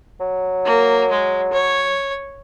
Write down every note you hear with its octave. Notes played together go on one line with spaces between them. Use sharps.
F#3
A#3
G#3
C#5